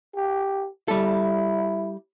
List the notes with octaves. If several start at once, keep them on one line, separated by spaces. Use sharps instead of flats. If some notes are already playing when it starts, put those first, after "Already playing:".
G4
G3 E4 A4